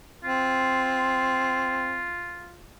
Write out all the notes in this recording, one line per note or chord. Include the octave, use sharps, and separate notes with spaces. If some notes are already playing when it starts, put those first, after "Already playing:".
C4 F4